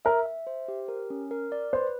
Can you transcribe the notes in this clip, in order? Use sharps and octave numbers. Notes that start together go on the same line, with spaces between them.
A#4 E5
E5
C5
G4
A#4
C#4
A#4
D5
B4 C5